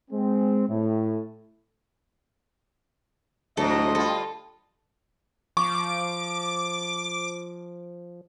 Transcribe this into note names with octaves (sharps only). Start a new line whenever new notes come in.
G#3 C4
A2
D2 G#2 C3 F#3 A4 D#5 A#5
G3 F4 A4
F3 C#6 D6